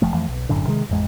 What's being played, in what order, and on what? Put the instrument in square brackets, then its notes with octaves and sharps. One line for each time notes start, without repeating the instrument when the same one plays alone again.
[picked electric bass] F1 F3 A3
F2 E3 F3 A3
B1
G1 F#2 A2 D3
C3 D#3 F3 G#3
A1 F2 G#3